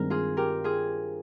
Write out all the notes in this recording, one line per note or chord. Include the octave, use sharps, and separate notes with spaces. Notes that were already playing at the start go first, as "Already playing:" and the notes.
Already playing: G2 D#3 G#3 C4 A#4
F4 G#4
G4 A#4
F4 G#4